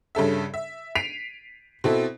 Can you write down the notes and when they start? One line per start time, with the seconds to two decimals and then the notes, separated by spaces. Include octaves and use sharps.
0.15 G2 C#3 A4 E5
0.54 E5
0.95 B6 C7 D7 D#7 F7
1.84 B2 C4 E4 A4